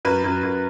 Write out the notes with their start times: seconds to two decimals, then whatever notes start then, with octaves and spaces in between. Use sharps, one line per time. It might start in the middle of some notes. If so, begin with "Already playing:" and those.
0.05 F#2 B4
0.24 F#2
0.43 F#2